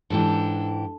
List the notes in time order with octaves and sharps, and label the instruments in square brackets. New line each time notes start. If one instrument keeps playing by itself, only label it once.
[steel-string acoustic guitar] G#2 E3 G4 [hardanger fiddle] D4 A4